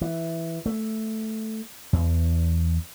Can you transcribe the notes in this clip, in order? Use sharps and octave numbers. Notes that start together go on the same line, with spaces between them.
E3
A3
E2